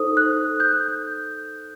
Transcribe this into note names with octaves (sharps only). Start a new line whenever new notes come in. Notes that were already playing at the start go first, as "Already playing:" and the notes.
Already playing: D#4 A4 C5 D#6
F#6
G6